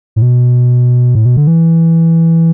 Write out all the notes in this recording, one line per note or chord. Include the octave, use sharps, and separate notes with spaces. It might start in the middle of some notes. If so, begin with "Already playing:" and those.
A2
B2
A2
B2
D3
E3